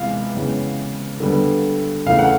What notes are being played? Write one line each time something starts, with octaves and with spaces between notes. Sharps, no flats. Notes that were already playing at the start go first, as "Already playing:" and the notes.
Already playing: C3 E3 G#3 B3 F5
C#3 E3 G#3 B3
D3 G3 B3
C#3 E3 A3 F5
F#5